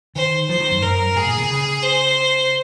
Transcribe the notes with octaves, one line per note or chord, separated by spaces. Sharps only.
D#3 C5
F3 C5
D#3
F#2
F#2 A#4
G#2 G#4
A#2
C3
C#3
C5